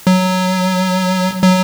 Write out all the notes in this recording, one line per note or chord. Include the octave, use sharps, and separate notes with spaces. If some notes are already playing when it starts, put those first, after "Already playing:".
F#3
F#3